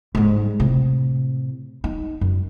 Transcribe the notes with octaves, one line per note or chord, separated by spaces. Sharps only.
G#2 G3
A2 C3
D#4
F#2